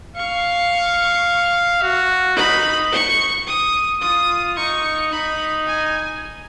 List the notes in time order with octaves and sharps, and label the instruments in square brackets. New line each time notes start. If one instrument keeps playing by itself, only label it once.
[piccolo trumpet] F5 [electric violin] C#6
[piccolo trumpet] F#4
[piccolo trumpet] D#4 [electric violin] B5
[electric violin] C#6
D#6
[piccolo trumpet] F4 [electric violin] D#6
[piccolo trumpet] D#4 [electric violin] C#6
[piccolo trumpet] D#4 [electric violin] B5
[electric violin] G#5